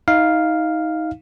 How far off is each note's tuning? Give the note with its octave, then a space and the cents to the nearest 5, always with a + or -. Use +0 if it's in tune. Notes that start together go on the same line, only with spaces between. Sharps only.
D#4 +25 F5 +0